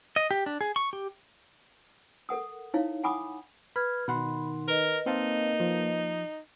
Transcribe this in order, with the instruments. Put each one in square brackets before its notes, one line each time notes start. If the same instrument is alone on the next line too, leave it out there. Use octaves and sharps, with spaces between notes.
[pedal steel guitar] D#5
G4
D4
G#4
C#6
G4
[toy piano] A4 A#4 F#5 D#6
D#4 E4 C#5 F5
F#5 G#5 B5 D6 D#6
[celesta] B4 F6 G#6 [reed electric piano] B5
[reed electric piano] B2 F#5 C6 [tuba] D#3 [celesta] B5
[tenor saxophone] A#4 [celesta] B4 D#5
[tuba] A#3 [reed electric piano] C4 F5 A5 [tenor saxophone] D#4
[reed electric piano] F3